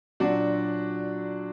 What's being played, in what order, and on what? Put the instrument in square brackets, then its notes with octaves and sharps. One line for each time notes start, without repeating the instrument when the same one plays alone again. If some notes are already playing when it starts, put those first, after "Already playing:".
[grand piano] A#2 F#3 D4 F#4